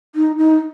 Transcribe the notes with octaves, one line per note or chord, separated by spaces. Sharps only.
D#4
D#4